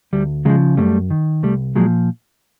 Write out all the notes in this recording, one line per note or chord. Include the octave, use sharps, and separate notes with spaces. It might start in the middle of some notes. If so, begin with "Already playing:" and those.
D2 G3
C#3 F3 F#3 G#3
F#2 G3 A3
D#3
C2 G3 A3
A#2 F3 F#3 G#3